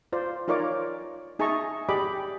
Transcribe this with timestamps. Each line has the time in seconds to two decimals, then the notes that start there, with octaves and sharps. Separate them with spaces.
0.13 F4 C5 D5
0.48 D#4 F4 A#4 C#5 D5 D6
1.39 D#4 G#4 E5 A5 A#5 C#6
1.89 G4 G#4 D5 D#5 B5 D6